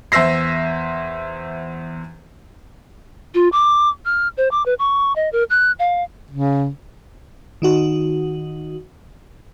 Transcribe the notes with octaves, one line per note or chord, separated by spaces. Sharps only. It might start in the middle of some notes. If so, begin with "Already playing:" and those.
E2 C5 E5 E6 A#6 C7
F4
D6
F6
C5
D6
B4
C#6
D#5
A#4
F#6
F5
C#3
D#3 D#4 F#4